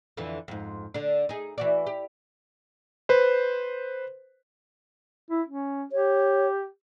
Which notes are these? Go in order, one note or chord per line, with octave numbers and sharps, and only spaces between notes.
F2 D3 E3
F2 G#2
D3 D4
D#4 G#4
E3 F#4 D5
G4
B4 C5
E4
C#4
G4 C#5